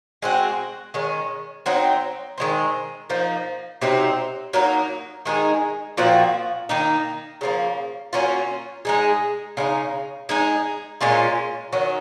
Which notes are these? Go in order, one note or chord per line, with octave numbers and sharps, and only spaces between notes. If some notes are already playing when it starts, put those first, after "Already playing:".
G#3 C4 F#4
D#3 G#3 C#4
F#3 C4 D#4
D#3 G#3 C4
F3 A#3 D#4
C3 F#3 C4 D#4
F#3 A#3 D#4
D#3 G#3 D#4 G#4
A#2 F3 C4 F#4
D#3 A#3 D#4
C#3 F3 A#3
F#3 A#3 C#4 F4
G#3 D#4 G#4
C#3 G#3 D#4
G#3 D#4 G#4
A#2 G#3 C#4 F4
D#3 F#3 C#4